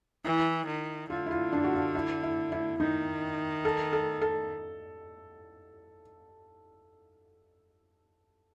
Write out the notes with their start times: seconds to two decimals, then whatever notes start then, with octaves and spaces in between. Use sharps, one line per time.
0.24 E3 E4
0.67 D#3
1.10 D3 F4
1.26 E4
1.31 F4
1.53 D4
1.64 F#4
1.73 F4
1.95 E4
2.23 E4
2.52 E4
2.80 D#3 D#4
3.65 A4
3.93 A4
4.21 A4